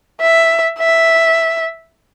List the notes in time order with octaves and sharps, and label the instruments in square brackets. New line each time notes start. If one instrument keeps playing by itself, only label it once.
[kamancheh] E5
E5